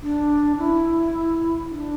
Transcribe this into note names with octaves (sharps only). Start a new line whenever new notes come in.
D4
E4
D4